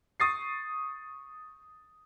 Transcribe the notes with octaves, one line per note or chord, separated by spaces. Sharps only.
C#6 D#6 A6 C7